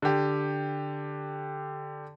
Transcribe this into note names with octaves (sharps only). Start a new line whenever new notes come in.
D3 G4